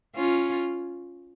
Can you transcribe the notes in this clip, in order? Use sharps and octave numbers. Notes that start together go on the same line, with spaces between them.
C#4 F4